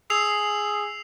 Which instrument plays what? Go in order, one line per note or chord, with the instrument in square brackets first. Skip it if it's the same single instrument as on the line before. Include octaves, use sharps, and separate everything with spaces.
[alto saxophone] G#4 [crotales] E6 C7 F7